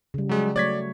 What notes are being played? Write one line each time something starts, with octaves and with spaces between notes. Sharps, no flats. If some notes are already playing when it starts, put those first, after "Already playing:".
C#3 G3
F#3 G#3
F#3 A3 C#5 D5 G#6 B6